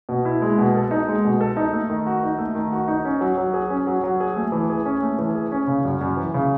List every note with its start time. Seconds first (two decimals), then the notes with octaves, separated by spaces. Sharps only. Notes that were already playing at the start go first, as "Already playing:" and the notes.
0.09 B2
0.25 E4
0.42 G#3
0.58 B2
0.75 A4
0.91 D#4
1.08 G#3
1.24 B2
1.41 A4
1.57 D#4
1.73 A3
1.90 D#3
2.07 F#4
2.23 D#4
2.39 A3
2.55 D#3
2.72 F#4
2.88 D#4
3.05 C#4
3.21 F#3
3.38 F#3
3.54 G#4
3.70 C#4
3.87 F#3
4.04 F#3
4.20 G#4
4.36 A3
4.52 E3
4.70 G#4
4.86 C#4
5.03 A3
5.19 E3
5.35 G#4
5.52 C#4
5.67 C#3
5.85 F#2
6.01 F#2
6.17 E3
6.34 C#3